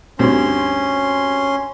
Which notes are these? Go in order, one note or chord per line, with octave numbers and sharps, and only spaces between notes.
D2 G2 C4 C#4 C6